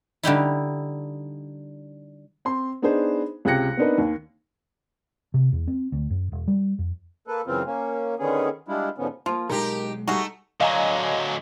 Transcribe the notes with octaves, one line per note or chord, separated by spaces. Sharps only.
D3 G3 D#4 E4
C4 C6
B3 D4 D#4 G#4 B4 C5
C#2 C3 G5 F#6 A#6 C#7
B3 C4 D4 D#4 A#4 B4
D#2
C3
E2
C4
D2
F#2
E1
G3
F2
A#3 A4 B4
F#2 C#3 E3 C4 F4
A#3 C#4
D3 D#3 B3 C#4 G#4
G3 G#3 D4 E4 F4
G#2 B2 D3 F3 B3 C#4
F3 A#3 F4
B1 G#3 D#4 G4 A#4
G3 A3 D#4 F#4 G#4
D3 F#3 D#5 F5 G#5 A#5